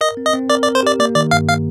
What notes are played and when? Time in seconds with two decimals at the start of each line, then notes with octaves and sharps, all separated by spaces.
0.01 A#4 D#5
0.17 C4
0.26 D#5
0.34 C4
0.49 A#4 D5
0.62 D5
0.67 A#4
0.75 C5
0.83 G4 D5
1.00 A#3 D5
1.16 D#3 D5
1.31 G2 F5
1.48 F5